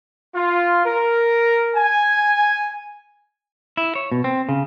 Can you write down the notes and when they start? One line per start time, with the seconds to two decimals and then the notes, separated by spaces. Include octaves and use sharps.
0.35 F4
0.86 A#4
1.76 G#5
3.77 E4
3.95 C#5
4.12 B2
4.24 C4
4.49 C#3